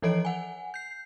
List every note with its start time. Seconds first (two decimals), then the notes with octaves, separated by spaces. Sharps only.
0.02 E3 F3 A4 C#5 D#5 D7
0.25 F#5 G#5
0.74 G6 C7